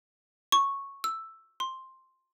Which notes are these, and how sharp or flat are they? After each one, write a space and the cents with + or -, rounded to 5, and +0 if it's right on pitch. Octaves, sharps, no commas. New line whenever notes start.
C#6 -5
E6 +5
C6 +5